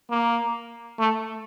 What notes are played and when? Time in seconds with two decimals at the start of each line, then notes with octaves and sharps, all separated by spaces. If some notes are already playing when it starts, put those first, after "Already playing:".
0.10 A#3
0.99 A3